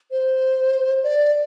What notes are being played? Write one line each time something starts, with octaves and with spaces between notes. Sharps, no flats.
C5
D5